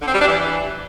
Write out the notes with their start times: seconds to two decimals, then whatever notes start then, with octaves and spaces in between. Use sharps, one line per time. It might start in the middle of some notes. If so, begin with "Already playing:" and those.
0.01 D3
0.07 C4
0.14 G3
0.20 D4
0.26 E3